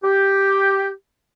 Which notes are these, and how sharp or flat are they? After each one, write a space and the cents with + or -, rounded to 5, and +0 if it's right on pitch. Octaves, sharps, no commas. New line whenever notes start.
G4 +0